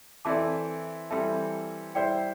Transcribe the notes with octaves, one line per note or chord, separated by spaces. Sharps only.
E3 C4 E4 A4 D5 A5 D6
E3 G3 C4 A4 E5 A5
G3 E4 C5 D5 G5